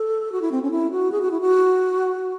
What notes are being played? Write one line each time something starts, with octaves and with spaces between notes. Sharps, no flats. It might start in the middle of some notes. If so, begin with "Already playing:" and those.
Already playing: A4
F#4
E4
C4
C#4
E4
F#4
G#4
F#4
E4
F#4